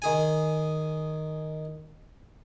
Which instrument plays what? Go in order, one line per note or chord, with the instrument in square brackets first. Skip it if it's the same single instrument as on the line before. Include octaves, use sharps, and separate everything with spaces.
[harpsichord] D#3 G#4 G#5